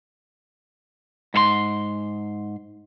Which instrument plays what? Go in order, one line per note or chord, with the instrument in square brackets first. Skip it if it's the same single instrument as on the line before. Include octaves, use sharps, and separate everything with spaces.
[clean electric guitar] G#2 A4 C6